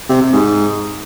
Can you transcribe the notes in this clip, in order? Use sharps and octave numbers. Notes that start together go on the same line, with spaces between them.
C3
C3
G#2